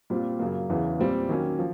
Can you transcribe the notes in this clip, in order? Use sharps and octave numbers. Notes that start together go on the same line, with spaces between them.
A#2 G3 C4 F4
F#2 C#3 F#3 A#3
E2 C#3 E3
A#2 G3 C4
D#3 F#3 A#3 C#4
F3